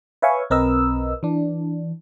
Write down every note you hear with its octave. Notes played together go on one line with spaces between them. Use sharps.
B4 C#5 E5 F5 G#5 C#6
B1 C4 A#4 B4 D#5 E6
E3 D4